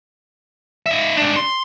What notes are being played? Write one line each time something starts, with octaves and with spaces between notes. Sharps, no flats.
D#4 E5
G#2 D4
C6